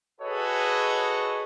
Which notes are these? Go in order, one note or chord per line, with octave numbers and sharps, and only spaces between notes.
F#4 G#4 A4 B4 C#5 D#5